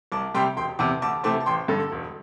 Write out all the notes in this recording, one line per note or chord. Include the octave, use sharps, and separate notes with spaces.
C2 A5 D6
C3 G3 G5 C6
E1 G5 C6
E2 C3 A5 D6
D2 A5 D6
C3 E3 A3 C4 A5 D6
A5
A1 G5 C6
G2 D3 A4
E1